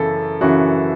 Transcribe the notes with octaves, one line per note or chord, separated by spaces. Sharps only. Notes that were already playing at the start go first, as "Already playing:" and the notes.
Already playing: F#2 C#3 E3 A4
F#2 C#3 E3 F#4